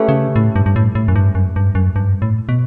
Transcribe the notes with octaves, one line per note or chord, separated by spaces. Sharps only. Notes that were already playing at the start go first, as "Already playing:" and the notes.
Already playing: A3 C#4 G4 B4
C#3
A2
G2
G2
A2
A2
F#2
G2
F#2
G2
F#2
G2
A2
B2